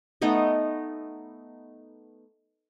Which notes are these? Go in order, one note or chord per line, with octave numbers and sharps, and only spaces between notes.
A3 B3 D#4 D#5